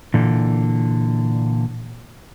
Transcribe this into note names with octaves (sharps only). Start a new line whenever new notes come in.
A#2 D3 E3